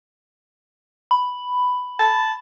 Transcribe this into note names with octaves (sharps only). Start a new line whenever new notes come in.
B5
A5